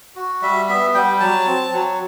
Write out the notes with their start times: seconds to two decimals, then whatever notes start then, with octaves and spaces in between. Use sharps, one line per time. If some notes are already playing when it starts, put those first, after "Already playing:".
0.16 F#4
0.42 G3 E5
0.68 B3 E5
0.94 G3 G5
1.20 F#3 A5
1.47 C4
1.73 F#3